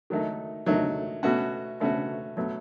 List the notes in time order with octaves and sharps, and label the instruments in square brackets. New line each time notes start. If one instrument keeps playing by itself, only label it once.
[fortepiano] D#3 F#3 A3 D#4
D#3 F#3 A3 D#4
B2 A3 C#4 F#4
B2 A3 C#4 F#4
B2 F#3 A3